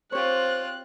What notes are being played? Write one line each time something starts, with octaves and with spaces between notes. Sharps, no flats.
C4 F4 G4 C5 C#5 F#6